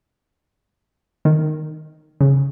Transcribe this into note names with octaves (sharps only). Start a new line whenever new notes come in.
D#3
C#3